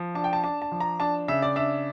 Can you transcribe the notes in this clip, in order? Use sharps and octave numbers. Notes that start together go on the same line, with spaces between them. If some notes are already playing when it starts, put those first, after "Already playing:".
Already playing: F3
D4 A5
G5
A5
D4 A5
A5
F3
A#5
D4 A5
C#3 E5
D5
D4 E5